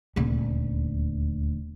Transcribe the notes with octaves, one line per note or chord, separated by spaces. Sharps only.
D#1 D2